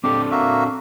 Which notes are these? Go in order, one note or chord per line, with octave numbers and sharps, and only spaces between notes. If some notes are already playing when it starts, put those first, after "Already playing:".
C4 D4 G4 A4
A#3 F#4 E5